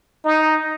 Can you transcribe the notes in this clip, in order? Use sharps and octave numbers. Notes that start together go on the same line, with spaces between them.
D#4